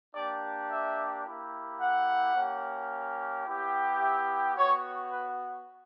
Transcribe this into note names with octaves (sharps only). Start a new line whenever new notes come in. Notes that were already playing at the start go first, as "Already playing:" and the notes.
A#3 D4 G4 D5
E5
A#3 E4 G4
F#5
A#3 C#4 G4
B3 E4 G4
E5
B3 F#4 C#5
B4